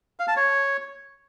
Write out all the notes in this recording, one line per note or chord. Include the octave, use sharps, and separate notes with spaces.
F5
A5
C#5